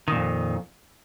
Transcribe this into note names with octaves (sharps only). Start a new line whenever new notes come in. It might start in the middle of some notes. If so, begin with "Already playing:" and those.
F2 A#2 D#3